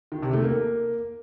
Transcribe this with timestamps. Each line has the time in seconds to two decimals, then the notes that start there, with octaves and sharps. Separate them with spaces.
0.12 D#3
0.22 C3
0.33 A3
0.44 A#3